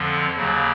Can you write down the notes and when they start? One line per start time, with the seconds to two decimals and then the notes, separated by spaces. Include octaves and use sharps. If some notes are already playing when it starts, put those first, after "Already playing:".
Already playing: F2 D3 F3
0.37 D#2 C#3 F#3